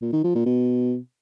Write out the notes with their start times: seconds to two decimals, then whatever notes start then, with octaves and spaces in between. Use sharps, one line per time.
0.02 A#2
0.13 D#3
0.24 F3
0.35 A#2
0.46 B2